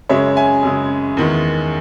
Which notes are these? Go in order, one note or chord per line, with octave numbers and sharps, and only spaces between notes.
F#2 C#3 G#3 C#5 E5
E5 G#5
F#2 C#3 G#3
E2 D#3 G#3